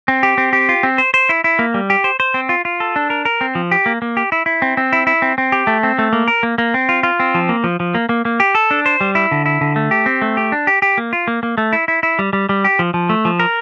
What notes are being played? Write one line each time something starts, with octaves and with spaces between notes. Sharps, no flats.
C4
G4
C4
G4
F4
C4
C5
C5
E4
E4
A#3
G3
G4
C5
C5
C4
F4
F4
A4
D4
A#4
A#4
C4
F3
G4
A#3
A#3
G4
E4
E4
C4
C4
E4
E4
C4
C4
G4
A3
C4
A3
A#3
A#4
A#3
A#3
C4
F4
F4
C4
F3
A#3
F3
F3
A#3
A#3
A#3
G4
A4
D4
C5
G3
E4
D3
E4
D3
A3
G4
C4
A3
G4
D4
G4
G4
A#3
F4
A#3
A#3
A3
E4
E4
E4
G3
G3
G3
G4
F3
F3
A3
F3
A#4